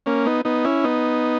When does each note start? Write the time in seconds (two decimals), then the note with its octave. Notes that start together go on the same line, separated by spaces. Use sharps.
0.06 A#3 C#4
0.26 B3 D#4
0.45 B3 D#4
0.65 C#4 E4
0.84 B3 D#4